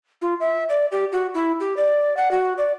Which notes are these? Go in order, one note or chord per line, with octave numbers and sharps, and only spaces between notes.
F4
E5
D5
G4
F#4
E4
G4
D5
F#5
F#4
D5